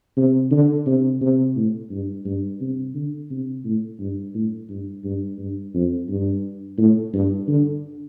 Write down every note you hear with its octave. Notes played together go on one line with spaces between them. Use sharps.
C3
D3
C3
C3
A2
G2
G2
C3
D3
C3
A2
G2
A2
G2
G2
G2
F2
G2
A2
G2
D3